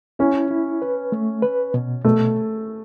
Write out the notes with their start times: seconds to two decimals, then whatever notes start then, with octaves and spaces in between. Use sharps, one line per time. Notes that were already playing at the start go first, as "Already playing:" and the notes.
0.19 C#4 E4
0.51 E4
0.82 B4
1.12 A3
1.42 B4
1.74 B2
2.04 B2 A3